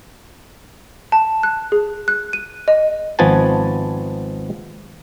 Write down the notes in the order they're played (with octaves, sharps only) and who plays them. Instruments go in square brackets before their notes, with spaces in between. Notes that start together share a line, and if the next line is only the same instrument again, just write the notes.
[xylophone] A5
F#6
G#4
F#6
D#7
D#5
[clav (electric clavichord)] G#1 F3 B3 B4 G#5 A5